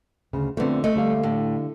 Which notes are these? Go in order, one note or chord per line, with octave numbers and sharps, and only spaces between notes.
D2 C#3
F2 D3 A3 B3 C4
A3 D#5
D3 G3 F5
A2